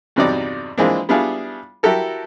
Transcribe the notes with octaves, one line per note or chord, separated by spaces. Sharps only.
E2 G2 C3 F#3 D#4 D5
E3 F3 G#3 A#3 C4 D4
G3 B3 D4 E4 F4 G#4
E4 F#4 G4 A4 A#4